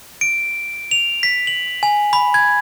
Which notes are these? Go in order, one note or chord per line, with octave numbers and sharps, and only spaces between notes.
D7
F7
B6
F#7
G#5
B5
G#6